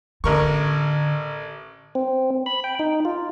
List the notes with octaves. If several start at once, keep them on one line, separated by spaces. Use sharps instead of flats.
A1 D3 A#4 C#6
C4
B5
G5
D#4
F4